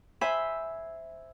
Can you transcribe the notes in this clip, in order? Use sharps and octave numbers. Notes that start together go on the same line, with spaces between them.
C5 E5 G#5 B5